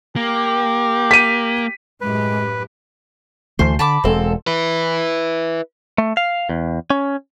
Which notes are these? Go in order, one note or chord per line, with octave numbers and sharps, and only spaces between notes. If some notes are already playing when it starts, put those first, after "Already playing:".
A#3 G4
B6 D#7
F#2 A2 G#3 G4 B4
D2 E3 A3 C5
D3 A5 B5 D6
E1 G#3 C4 A4
E4 B4
A3
F5
E2
C#4